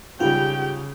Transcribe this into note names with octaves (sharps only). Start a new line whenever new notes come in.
G#2 C#3 G3 F4 G4 G5